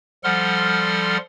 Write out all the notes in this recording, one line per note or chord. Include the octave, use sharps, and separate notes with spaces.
F3 G3 A4 F#5 C6 F6